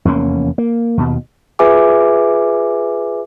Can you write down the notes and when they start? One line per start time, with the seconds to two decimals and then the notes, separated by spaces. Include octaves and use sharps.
0.05 F1 E2 A#3 C#4
0.58 A#3
0.97 D#2 B2
1.59 F4 G#4 B4 E5 G#5 D6